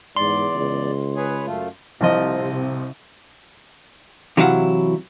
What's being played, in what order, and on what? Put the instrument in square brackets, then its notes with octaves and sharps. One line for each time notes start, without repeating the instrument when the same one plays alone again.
[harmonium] E2 D5 [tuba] G#2 [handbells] C6
[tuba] C#2
[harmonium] G#4 B4 C#5
F#2 A3 F4
[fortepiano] C2 F3 D#5 [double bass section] C3
[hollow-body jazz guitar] C3 E3 F#3 E4 F5 F#5